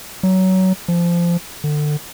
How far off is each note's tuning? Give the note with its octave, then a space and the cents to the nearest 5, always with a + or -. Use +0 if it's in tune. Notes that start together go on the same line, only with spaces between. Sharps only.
F#3 +20
F3 -20
D3 +25